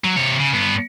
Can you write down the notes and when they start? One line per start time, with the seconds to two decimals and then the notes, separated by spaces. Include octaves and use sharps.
0.04 F#3
0.17 C3 C#5
0.40 C#3
0.53 G2 B3